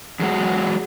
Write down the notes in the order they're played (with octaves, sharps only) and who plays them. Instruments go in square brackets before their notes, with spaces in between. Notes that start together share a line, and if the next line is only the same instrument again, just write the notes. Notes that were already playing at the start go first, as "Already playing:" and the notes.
[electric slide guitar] E2 F#3 G#3 F#4